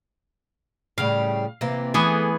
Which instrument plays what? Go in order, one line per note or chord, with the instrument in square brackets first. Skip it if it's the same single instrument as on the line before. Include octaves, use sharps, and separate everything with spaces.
[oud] A2 C#3 G3 [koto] F5
[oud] C3 E3 A#3
[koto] E3 B3 G#4 [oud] A3